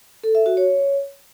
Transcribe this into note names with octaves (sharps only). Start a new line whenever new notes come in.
A4
E5
F#4
C#5